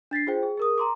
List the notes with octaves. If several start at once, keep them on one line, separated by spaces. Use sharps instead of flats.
D4 A6 B6 C7
F4 G#4 C5 G5
G#4
G#4 A#4 D#6
A#5 C6 D6